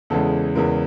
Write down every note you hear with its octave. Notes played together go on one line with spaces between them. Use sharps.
E2 C#3 E3 G#3 A4
E2 C#3 E3 G#3 A#4